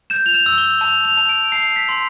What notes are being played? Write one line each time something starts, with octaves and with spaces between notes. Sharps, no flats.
G6 E7
F7
E7
E6
G7
A5 F7
F7
A5
D7
A5 C7
B6
C6